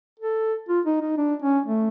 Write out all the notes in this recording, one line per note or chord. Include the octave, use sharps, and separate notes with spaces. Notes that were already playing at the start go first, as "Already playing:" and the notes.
A4
F4
D#4
D#4
D4
C#4
A3